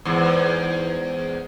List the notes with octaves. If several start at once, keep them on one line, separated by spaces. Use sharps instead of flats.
E2 G#2